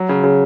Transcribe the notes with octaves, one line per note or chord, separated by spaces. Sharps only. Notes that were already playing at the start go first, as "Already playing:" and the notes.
Already playing: F#3
C#3
C#3